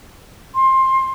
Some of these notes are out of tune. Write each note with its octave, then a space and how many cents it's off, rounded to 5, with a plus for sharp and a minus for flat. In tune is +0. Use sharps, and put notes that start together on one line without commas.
C6 +20